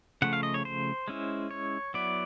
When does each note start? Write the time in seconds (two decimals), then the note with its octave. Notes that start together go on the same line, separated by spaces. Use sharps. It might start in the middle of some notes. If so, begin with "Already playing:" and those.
0.22 C#3 F3 A3 F#5
0.33 F5
0.43 D#5
0.54 C#5
0.65 C5
1.08 G#3 C#4 E4
1.51 C#5
1.94 F#3 B3 E4 D5